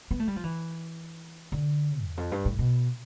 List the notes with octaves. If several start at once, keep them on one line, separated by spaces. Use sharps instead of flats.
B3
A3
G3
F3
E3
D3
E2
F2
G2
A2
B2